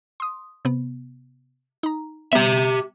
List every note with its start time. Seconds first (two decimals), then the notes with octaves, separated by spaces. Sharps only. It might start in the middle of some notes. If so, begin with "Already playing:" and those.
0.20 C6 D#6
0.65 C3 B3
1.83 D#4 A#5
2.33 G3 B3 G4 E5